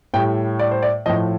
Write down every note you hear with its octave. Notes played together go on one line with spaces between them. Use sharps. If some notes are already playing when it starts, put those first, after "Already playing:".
A2 G3 G5
D5
C5
D5
A2 F3 D#5